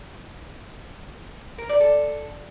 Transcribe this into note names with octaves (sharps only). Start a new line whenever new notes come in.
A#4
D5
A4